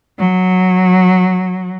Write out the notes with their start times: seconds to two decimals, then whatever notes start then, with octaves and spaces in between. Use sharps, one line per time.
0.19 F#3